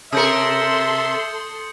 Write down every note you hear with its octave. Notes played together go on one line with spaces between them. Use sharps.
C3 A4 A#4 E5 C6 D#6 G6 C#7